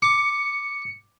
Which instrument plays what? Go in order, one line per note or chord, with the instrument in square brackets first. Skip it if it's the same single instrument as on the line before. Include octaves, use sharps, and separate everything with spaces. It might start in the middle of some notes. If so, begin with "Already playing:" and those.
[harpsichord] D6 [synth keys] C#7